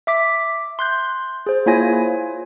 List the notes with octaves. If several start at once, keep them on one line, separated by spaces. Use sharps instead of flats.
E5 D6 B6
C6 F#6 G6
G#4 C5
A#3 E4 F4 C#5 G#5 A#6
F4